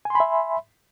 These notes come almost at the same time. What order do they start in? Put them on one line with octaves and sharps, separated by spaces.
G#5 C6 B5 E5